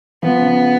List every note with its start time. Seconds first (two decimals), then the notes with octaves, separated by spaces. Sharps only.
0.23 F3 B3
0.39 C#3